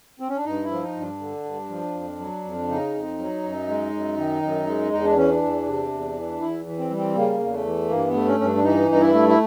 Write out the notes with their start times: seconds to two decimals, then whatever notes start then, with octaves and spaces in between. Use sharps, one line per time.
0.20 C4
0.29 C#4
0.37 D4
0.45 G2 D#4
0.64 E4
0.71 F3
0.83 D#4
0.96 G2
1.01 D4
1.20 D3
1.44 G2
1.69 F3
1.95 F2
2.19 F#3
2.44 F2
2.68 C#3 D#4
2.94 F2
3.19 F#3
3.43 F#2
3.68 G#3
3.93 F#2
4.18 D#3
4.43 F#2
4.67 G#3
4.92 E2 D#4
5.04 D4
5.16 E3 C#4
5.30 D4
5.42 E2
5.66 C3
5.91 E2
6.16 E3
6.41 E2 E4
6.66 E3
6.78 C4
6.90 G3
6.97 C4
7.15 C#3 A#3
7.40 E2
7.53 A3
7.65 E3
7.89 G2 A#3
8.08 B3
8.14 A3
8.27 C#4
8.39 G2 C#4
8.46 D4
8.56 D4
8.64 E3 D#4
8.89 G2 D#4
9.01 E4
9.13 A3
9.29 E4